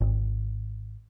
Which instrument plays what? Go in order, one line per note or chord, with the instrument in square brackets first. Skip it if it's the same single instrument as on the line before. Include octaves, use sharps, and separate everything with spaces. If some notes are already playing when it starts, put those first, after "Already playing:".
[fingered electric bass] G#1